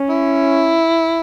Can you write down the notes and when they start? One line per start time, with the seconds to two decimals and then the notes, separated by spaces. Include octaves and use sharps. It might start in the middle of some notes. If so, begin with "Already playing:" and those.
Already playing: C#4
0.09 E4